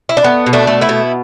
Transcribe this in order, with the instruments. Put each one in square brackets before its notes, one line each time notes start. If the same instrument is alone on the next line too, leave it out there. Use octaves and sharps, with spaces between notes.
[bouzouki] E4
D4
A3 B3
B2
A3 D4
A3
B3 E4
B2